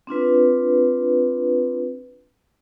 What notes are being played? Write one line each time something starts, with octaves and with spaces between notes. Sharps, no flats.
C4 D4 F4 B4